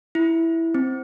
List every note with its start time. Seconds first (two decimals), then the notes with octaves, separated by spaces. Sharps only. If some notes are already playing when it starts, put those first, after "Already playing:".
0.15 E4
0.74 C4